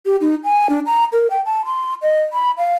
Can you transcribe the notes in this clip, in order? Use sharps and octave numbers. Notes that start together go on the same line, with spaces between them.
G4
D#4
G#5
D4
A#5
A#4
G5
A5
C6
D#5
B5
F5